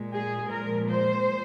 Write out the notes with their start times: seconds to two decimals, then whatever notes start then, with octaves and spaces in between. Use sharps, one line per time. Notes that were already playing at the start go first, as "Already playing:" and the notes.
Already playing: A#2 G#3
0.12 G#4
0.50 A#2 F3 G#3 A#4
0.89 C5